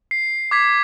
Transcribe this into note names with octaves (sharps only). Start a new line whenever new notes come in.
C7
D6 G#6 B6